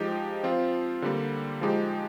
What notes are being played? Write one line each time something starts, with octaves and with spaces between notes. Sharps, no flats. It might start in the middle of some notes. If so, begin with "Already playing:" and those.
Already playing: F3 G#3 D#4 G4
F3 C4 F4
D3 G3 A#3
F3 G#3 D#4 G4